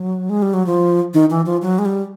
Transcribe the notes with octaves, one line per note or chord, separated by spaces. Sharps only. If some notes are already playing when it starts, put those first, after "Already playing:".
Already playing: F#3
G#3
G3
F#3
F3
D#3
E3
F3
F#3
G#3
G3